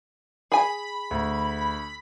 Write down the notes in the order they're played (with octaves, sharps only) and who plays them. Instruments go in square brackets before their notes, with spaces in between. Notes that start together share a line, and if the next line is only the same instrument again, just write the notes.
[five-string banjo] G#4 G#5 [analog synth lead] B5
[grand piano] D2